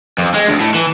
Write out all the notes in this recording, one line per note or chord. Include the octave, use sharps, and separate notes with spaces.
F2
G#3
D2
A2
E3